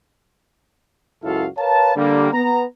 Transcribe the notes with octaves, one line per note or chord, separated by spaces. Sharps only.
C#2 F#2 E4 F#4 A4 F5
A#4 B4 C#5 F5 A5
D3 G3 A#3
B3 A#5